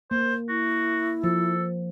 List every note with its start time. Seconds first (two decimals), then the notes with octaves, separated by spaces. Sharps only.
0.11 A#3 C5
0.49 E4 F#4
1.24 F3 A4